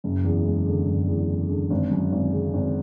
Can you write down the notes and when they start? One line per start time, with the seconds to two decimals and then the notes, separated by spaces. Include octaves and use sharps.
0.04 F#1
0.24 E2
0.45 G#3
0.67 D3
0.87 F#1
1.08 E2
1.30 G#3
1.49 D3
1.70 G#1
1.91 F#2
2.12 G#1
2.34 C#3
2.54 G#1